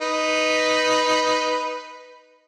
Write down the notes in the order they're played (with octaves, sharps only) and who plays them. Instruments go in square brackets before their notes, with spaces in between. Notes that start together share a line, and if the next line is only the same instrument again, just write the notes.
[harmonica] D#4 B4